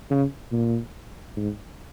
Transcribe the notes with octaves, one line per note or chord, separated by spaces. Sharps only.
C#3
A#2
G#2